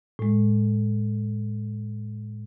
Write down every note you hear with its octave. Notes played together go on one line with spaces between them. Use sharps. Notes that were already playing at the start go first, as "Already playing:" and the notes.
A2 G#3